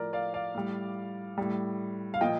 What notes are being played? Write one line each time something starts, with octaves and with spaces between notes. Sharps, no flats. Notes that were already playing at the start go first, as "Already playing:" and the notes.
Already playing: A2 F3 A#4 D5
D5 F5
D5 F5
A2 G3
A2 G3
F5
A#2 F3 D#5 G5